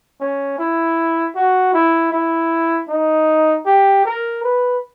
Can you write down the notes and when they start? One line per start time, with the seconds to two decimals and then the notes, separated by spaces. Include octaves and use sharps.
0.20 C#4
0.59 E4
1.36 F#4
1.74 E4
2.13 E4
2.89 D#4
3.66 G4
4.05 A#4
4.44 B4